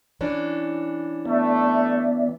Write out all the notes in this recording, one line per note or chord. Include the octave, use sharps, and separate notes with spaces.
E3 C#4 D4
A3 B3 D5 E5